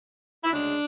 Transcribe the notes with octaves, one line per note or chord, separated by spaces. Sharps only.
E4
D2 C#3 G#3 D4